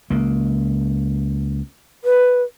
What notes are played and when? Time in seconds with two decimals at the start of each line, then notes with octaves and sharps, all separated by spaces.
0.10 C#2 A#3
2.04 B4